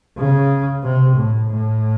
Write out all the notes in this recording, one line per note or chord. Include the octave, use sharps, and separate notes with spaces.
C#3
C3
A2
A2